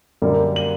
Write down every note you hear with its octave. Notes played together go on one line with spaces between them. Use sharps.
F#2 D3 G3 A#3
F#7